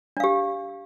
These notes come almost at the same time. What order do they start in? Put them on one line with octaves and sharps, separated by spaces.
D4 F5 G4